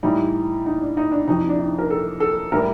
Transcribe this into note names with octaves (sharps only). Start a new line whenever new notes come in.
A2 E3 G3 D#4
D#4
D4
D#4
D4
F2 C3 E3 D#4
D4
D#4
A#4
A4
A4
A2 E3 G3 A#4